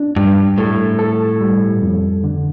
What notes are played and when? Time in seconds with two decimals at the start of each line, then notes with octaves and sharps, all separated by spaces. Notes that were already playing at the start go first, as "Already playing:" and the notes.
Already playing: D4
0.16 G2 G3
0.58 A2 A4
0.99 A4
1.41 G3
1.82 F2
2.24 D3